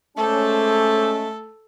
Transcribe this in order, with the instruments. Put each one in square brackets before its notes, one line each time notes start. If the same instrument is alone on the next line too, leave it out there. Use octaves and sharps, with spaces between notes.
[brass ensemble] G#3 C#4 [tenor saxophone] A3 [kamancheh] A4 [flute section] C5 A5 D6